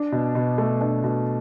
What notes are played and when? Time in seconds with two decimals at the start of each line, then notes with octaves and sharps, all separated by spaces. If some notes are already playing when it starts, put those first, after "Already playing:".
Already playing: D4
0.12 B2
0.35 B2
0.58 A3
0.81 D4
1.04 B2